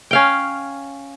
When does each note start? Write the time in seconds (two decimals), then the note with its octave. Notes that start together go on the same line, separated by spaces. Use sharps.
0.11 C#4 F5 G5